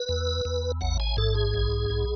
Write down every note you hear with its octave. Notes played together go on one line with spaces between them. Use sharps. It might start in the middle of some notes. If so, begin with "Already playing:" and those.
Already playing: B4
E2
E2
A1 F#5
G#5
G#2 A4
G#4
B1
B1